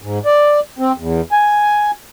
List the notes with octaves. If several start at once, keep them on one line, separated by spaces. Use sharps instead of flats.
G#2
D5
C4
E2
G#5